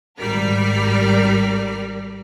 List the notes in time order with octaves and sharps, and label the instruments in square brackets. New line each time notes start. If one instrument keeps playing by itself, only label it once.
[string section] G#1 G3 A#4 D5 F6 B6